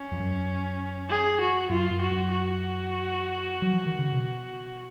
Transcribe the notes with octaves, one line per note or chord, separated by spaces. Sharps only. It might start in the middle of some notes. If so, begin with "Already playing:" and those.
Already playing: C#4
F2
F#2
G#4
F#4
F#2 F4
F#2
F#4
F#2
F#4
F#3
F3
D#3
C#3
B2